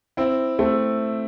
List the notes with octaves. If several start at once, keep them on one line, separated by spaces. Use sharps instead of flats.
C4 E4
A3 C4